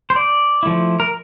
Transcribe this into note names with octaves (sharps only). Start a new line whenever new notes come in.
C5
D5
F3 A3 E4
A#4